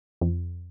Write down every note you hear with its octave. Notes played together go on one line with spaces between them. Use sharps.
F2